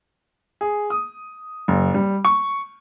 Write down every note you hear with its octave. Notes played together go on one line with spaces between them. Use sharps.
G#4
D#6
F#1
G3
C#6